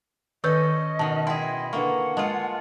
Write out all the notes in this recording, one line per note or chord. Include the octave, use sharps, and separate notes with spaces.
D#3 C#4 A4 B4 D#5 C#6 G6
B2 D#3 A5
E4 G#4 G5 C6
D#5
D3 A#3 B4 F#5 C#6
G#3 F4 A5